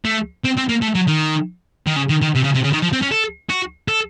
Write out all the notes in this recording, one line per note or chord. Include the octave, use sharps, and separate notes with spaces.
A3
C4
C4
A#3
A3
F#3
D#3
D#3
C#3
D#3
D#3
C3
C#3
C3
C#3
D#3
F3
C4
C#4
A4
F#4
A4